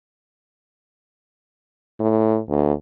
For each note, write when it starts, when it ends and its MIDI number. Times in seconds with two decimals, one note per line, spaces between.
1.99 2.39 45
2.48 2.73 38